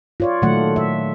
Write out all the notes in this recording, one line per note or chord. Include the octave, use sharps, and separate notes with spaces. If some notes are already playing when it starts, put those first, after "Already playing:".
F4 C#5 D5
A#2 D#3 F#3 A3 F#5
E5